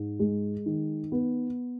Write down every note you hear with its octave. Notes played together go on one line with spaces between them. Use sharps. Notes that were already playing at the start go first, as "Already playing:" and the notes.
Already playing: G#2
G#3
D#3
B3